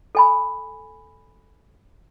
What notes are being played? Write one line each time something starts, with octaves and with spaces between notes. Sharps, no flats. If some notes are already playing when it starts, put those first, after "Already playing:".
A4 G#5 B5